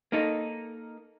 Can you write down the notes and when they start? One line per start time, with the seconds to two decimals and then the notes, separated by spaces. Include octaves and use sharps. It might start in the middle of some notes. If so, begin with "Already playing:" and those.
0.12 A#3 D#4 A4